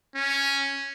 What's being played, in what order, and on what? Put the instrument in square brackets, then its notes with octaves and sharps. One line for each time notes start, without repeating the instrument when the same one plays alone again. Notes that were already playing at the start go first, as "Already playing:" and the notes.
[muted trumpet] C#4